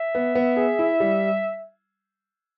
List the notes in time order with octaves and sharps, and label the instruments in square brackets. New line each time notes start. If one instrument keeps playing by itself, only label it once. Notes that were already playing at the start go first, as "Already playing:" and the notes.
Already playing: [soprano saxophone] E5
[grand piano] B3
B3
G#4
E4
G3